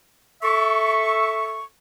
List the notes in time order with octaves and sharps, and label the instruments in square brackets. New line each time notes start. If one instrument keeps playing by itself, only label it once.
[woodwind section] A4 E5 C#6